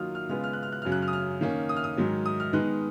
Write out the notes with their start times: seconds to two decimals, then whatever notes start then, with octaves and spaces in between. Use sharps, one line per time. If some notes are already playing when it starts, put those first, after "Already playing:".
Already playing: D#3 F#3 A#3 F4 D#6 F6
0.15 F6
0.29 C#3 G#3 B3 F4 F6
0.44 F6
0.53 F#6
0.63 F6
0.72 F#6
0.82 F#2 C#3 F#3 F6
0.92 F#6
1.02 F6
1.08 D#6
1.13 F6
1.41 D#3 A#3 C#4
1.69 D#6
1.76 F6
1.84 D#6
1.97 G#2 D#3 F#3
2.26 D#6
2.40 F6
2.53 D#3 G#3 B3 D#4 F#6